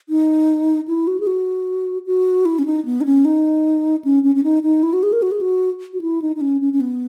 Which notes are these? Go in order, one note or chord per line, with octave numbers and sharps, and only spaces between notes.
D#4
E4
F#4
G#4
F#4
F#4
E4
C#4
D#4
B3
D#4
C#4
D#4
C#4
C#4
C#4
D#4
D#4
E4
F#4
G#4
A#4
F#4
G#4
F#4
F#4
E4
D#4
D#4
C#4
C#4
C#4
B3